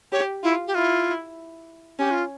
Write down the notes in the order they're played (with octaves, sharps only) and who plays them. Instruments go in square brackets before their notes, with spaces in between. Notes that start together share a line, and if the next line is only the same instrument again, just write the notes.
[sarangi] G4 [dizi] C#5
[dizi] E4 [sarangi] F4
[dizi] G4
[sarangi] E4 [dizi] F4
[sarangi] C#4 [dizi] G4
[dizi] F4